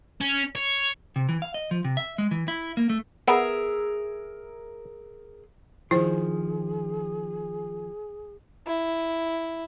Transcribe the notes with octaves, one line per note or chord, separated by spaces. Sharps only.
C#4
C#5
C3
E3
F5
D#5
F3
C3
E5
G#3
E3
E4
A#3
A3
B3 G#4 A#4 E5
D#3 F3 E4 G#4 C5
E4